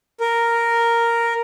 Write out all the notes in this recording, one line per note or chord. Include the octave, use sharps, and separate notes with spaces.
A#4